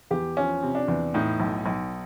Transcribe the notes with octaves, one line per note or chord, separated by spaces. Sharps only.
E2 G4
F3 C#4
C3
D4
E2
A2 D#4
B1
B1